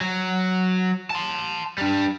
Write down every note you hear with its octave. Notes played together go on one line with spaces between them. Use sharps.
F#3
A5 C6
G3 D4